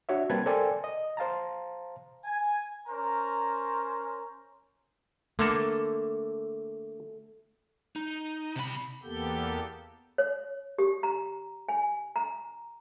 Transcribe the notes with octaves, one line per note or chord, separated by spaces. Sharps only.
D4 F#4 C#5 E5
G3 A#3 C4 B4 A5 G#6
A4 A#4 C5 D5 G5 G#5
D#5
C5 F5 A5 A#5
G#5
C#4 A#4 C5 A#5
D3 A3 A#3 A4
D#4
C3 B5
E2 A#3 B3 G4 A4 G6
C#5
G4
A#5
G#5
A#5